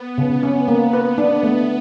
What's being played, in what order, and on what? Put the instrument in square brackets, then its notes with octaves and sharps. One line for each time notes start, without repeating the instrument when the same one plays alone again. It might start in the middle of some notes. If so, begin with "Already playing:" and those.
Already playing: [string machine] B3
[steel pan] C#3
C#4
A#3
B4
[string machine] B3 [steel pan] D4
[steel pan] A3